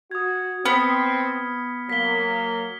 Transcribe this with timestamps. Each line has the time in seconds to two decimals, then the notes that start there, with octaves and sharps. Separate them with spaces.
0.11 F#4 D#6 G#6
0.65 B3 C4 F6 B6 C#7
1.90 F#3 A#3 B6 G7